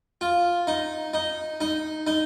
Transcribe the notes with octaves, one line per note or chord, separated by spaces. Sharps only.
F4
D#4
D#4
D#4
D#4